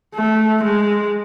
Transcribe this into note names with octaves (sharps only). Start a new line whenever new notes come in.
A3
G#3